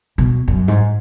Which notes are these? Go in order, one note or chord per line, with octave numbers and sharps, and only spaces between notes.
B2
F#2
G#2